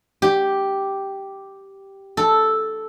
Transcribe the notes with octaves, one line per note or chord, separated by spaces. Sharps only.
G4
A4